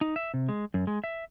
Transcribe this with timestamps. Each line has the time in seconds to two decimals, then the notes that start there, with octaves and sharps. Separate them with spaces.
0.01 D#4
0.16 E5
0.34 C3
0.49 G#3
0.74 F#2
0.87 G#3
1.04 E5